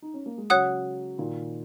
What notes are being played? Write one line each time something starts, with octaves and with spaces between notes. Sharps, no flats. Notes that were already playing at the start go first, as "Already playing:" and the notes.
D#4
C#4
A#3
G#3
C#3 F#3 C#5 F#5 D#6 F#6
A#2 D#3